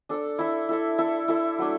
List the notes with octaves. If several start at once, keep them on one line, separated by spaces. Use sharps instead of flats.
D4 A4 D5
E4 A4 E5
E4 A4 E5
E4 A4 E5
E4 A4 E5
F#3 A3 D4